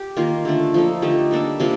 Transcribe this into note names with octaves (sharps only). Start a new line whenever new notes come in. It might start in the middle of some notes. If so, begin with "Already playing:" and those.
Already playing: G4
D#3 A#3 F4
D3 A3 D4
F3 A#3 D#4 A4
D3 A3 D#4 G4
G3 A#3 D4 A4
C3 G3 A#3 F4